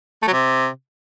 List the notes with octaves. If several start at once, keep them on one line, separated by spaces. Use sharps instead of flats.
A3
F#3
C3